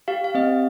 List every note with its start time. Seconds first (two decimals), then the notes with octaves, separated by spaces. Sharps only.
0.08 G4 F5
0.24 F5
0.35 C4 D#5